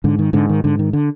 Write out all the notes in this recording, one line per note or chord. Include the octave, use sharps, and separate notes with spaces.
G#2 D3
D#3
G#2 D3
D#3
G#2 D3
D#3
D3